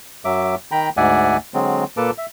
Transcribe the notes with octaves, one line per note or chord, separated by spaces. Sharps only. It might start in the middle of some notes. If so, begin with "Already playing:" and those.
F#2 F#3 E5 D6
D#3 G5 A#5 B5
D2 G#2 D5 E5 F#5 G#5
D3 F#3 G#3 C4
A#2 A#3 A4 B4 A5 D6
E5